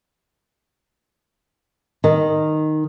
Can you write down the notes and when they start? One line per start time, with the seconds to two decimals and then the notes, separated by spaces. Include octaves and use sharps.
2.04 D#3